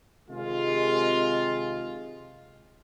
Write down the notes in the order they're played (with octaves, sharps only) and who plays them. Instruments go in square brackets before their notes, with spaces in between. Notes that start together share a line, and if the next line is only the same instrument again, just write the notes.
[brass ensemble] C3 D#3 G#3 F4